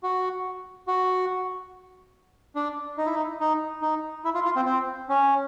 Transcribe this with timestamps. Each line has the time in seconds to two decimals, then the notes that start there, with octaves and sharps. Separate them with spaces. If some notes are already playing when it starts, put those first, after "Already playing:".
0.03 F#4
0.88 F#4
2.56 D4
2.98 D#4
3.06 E4
3.15 D#4
3.40 D#4
3.82 D#4
4.25 E4
4.35 F4
4.45 F4
4.56 C4
4.66 C4
5.09 C#4